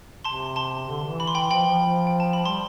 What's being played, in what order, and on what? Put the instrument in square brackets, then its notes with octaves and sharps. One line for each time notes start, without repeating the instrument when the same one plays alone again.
[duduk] C3 [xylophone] A5 C6
[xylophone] A5 C6
[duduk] D3
E3
[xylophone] B5
C6
G5 B5
[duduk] F3 [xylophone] G5 B5
[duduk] F3
[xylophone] G5
A5
B5
[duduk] G3 [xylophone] A5 C6